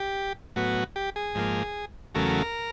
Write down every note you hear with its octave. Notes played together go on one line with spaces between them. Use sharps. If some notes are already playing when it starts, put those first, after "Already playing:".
Already playing: G4
A2 F#3 B3 F#4
G4
G#4
G#2 F3 A#3
E2 C#3 F#3 A3 A#4